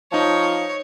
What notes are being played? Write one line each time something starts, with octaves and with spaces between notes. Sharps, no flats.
F3 D#4 C#5 A5